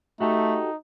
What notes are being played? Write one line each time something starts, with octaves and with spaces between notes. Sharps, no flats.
A3 D#4 F#4 G4 A4